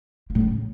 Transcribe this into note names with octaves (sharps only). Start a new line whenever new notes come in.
A#3
A2
C#3